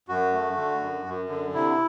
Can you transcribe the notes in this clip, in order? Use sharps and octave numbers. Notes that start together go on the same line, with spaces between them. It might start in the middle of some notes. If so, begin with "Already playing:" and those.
F#2 F#4
A3
D3
F#2
F#2
D3
C3 E4